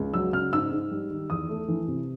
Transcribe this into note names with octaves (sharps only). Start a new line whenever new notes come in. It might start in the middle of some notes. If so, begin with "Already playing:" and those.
Already playing: C#2
F#3 E6
C#3 F6
G#2 E6
G#2
G3
D#3
E2 D#6
A3
E3
C3